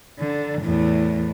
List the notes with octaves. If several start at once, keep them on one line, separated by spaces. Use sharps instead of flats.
D3
E2 A2